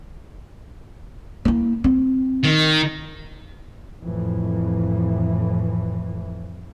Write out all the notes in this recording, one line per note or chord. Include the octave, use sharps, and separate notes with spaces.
A#3 E4
C4
D#3
F2 A2 E3